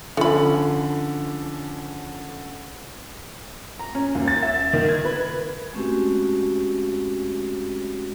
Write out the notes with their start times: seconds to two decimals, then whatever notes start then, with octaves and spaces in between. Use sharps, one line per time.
0.17 D3 F3 A3 C#4 B5
3.79 A#5
3.95 C#4
4.15 D#2
4.28 A6
4.43 E5
4.73 D#3
4.89 G#6
5.05 B4
5.73 G#3 A3 C4 C#4 F#4 G4